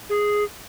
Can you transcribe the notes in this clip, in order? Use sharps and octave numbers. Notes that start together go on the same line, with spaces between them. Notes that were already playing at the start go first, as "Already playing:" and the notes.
G#4